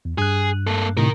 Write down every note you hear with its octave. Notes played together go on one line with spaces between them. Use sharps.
E2
G2 G#4 F#6
A#3 A4
A2 C3 D#3 A#4